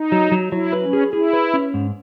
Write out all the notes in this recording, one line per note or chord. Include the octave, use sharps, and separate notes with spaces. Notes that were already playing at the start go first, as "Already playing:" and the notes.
Already playing: D#4
F#3
F#3
F#3 E4
B4
C#4
G#4
E4 G#4
B4
C#4
G#2